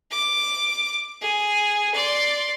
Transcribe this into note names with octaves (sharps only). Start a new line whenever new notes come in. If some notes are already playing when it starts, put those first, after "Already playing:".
D6
G#4
D5 C6